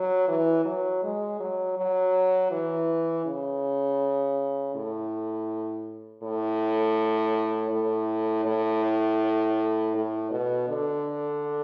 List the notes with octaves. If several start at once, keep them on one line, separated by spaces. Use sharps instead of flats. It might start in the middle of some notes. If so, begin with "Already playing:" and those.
Already playing: F#3
E3
F#3
G#3
F#3
F#3
E3
C#3
A2
A2
A2
A2
A2
B2
D3